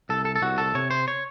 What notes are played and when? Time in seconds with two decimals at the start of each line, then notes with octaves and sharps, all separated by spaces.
0.09 C2 A4
0.25 A4
0.36 A4
0.42 C2 F#4
0.58 A4
0.75 C3 C#5
0.91 C5
1.08 C#5